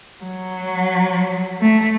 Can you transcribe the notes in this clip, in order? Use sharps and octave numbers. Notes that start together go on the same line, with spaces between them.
F#3
A3